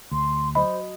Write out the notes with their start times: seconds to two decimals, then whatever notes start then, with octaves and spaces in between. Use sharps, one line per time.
0.11 D2 C6
0.55 F#3 C5 D#5 B5